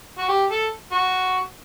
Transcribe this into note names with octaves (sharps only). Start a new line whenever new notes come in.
F#4
G4
A4
F#4